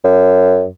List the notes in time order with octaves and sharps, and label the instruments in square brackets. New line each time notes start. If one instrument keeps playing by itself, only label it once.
[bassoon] F#2